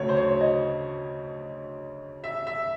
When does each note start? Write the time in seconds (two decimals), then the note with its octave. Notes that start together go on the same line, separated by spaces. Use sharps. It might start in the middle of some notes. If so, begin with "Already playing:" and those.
Already playing: D2 C#3 F#3 A3 C#5
0.09 C5
0.17 C#5
0.41 D#5
2.24 E5
2.47 E5